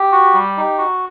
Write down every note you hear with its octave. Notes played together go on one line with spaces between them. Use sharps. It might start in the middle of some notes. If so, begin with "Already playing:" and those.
Already playing: G4
F#4
G3
D#4
F#4